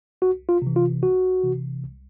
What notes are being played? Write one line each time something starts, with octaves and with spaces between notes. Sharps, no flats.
C2 F#4
F4
C3 E3
F4
C2 F#4
C3 E3
C2